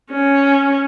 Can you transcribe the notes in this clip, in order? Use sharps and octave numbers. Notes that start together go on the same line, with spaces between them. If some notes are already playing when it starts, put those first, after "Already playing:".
C#4